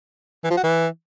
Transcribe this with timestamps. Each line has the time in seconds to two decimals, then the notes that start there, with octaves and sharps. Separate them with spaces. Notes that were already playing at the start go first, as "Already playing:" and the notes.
0.44 E3
0.51 F3
0.57 F#4
0.64 E3